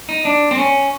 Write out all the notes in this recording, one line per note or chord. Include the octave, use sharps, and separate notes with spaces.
D#4
D4
C4
C#4